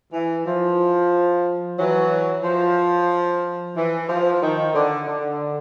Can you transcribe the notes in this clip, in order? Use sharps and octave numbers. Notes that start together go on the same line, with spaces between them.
E3
F3
E3 F#3
F3
E3
F3
D#3
D3
D3